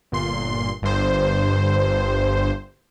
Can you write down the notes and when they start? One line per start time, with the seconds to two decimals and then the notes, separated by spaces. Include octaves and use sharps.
0.12 G1 A#2 C6
0.82 G1 G2 C5